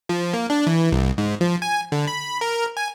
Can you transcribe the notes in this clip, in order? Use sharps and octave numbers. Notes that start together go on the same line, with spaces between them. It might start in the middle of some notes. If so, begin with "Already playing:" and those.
F3
A#3
D4
E3
C2
G#2
F3
G#5
D3
B5
A#4
G#5